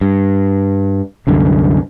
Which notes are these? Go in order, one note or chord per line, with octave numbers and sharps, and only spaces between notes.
G2
C2 F#2 D3